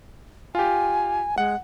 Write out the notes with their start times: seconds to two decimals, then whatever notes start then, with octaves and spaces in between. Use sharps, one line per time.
0.55 F4 G4 G#5
1.38 G#3 F#5